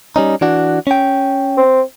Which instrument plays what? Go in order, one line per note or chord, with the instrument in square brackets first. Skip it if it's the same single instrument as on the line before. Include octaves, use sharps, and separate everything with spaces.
[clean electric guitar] G3 C#4 D#4
E3 D4 F#4
C#4 G5
[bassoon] C4